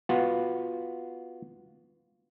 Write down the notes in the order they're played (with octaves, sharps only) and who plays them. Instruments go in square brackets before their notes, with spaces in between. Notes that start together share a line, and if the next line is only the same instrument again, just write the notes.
[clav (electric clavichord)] B3 F4 F#4